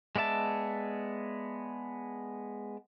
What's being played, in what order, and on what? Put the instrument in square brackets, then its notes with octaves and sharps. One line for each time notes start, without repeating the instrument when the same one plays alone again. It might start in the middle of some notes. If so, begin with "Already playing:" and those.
[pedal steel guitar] G#3 B3 D5 E5 A5